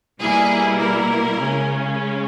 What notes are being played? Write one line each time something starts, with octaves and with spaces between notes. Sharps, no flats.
B2 G3 A#3 E4 G#4
A#4
C#3 G#3 C#4